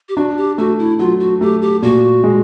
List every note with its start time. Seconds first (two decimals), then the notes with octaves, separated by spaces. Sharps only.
0.09 G4
0.16 D4 F#4
0.37 G4
0.58 A3 F#4
0.79 E4
0.99 F#3 F4
1.20 F#4
1.41 A3 G4
1.62 G4
1.83 A#2 F#4
2.24 G#3